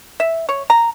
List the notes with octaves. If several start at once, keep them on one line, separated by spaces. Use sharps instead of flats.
E5
C#5
A#5